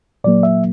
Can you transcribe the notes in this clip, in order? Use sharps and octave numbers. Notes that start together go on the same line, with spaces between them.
A#2 F#3 A#3 D5
E5